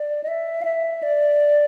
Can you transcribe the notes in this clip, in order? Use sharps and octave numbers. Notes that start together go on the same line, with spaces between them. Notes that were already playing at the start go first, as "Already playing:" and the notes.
Already playing: D5
D#5
E5
F5
E5
D5